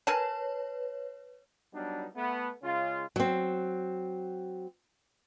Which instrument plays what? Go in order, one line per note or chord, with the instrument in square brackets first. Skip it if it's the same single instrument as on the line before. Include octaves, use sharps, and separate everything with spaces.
[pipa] A#4 G#5 A5 [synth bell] B4 C#5
[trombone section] F#3 G3 B3 D4 D#4
A3 B3
C#3 G#3 C#4 F4
[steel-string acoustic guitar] F#3 C4